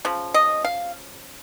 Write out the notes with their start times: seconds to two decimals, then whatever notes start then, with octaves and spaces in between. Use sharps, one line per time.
0.05 C#3 F3
0.34 D#5
0.65 F5